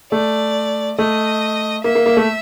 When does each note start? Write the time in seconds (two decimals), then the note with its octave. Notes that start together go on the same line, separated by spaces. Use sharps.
0.12 A3 D5
0.99 A3 D#5
1.84 A#3 E5
1.95 A#3
2.06 A#3
2.17 A3